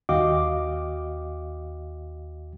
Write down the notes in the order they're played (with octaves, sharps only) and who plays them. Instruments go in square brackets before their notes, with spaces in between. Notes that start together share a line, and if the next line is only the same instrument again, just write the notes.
[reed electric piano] D#2 F#4 D#5 F5 G5 D6